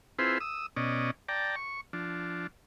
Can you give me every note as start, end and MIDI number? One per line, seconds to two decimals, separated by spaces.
0.19 0.38 60
0.19 0.38 64
0.19 0.38 65
0.19 0.38 68
0.19 0.38 71
0.19 0.38 72
0.40 0.66 87
0.40 0.66 88
0.76 1.11 47
0.76 1.11 61
0.76 1.11 74
0.76 1.11 75
1.28 1.56 74
1.28 1.56 79
1.28 1.56 81
1.28 1.56 82
1.56 1.81 85
1.93 2.47 53
1.93 2.47 62